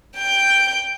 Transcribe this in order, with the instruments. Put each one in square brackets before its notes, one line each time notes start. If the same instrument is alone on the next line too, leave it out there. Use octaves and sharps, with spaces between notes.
[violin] G5 G6